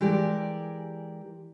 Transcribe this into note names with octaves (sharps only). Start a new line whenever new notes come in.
E3 G#3 G4 A#4 D5